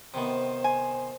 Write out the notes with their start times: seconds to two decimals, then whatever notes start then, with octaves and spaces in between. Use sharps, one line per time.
0.14 C3 D#3 B3 C5
0.64 G#5